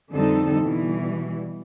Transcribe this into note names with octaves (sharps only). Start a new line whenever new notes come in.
F2 D3 G3 C4 D#4 A4
B2 E3 G3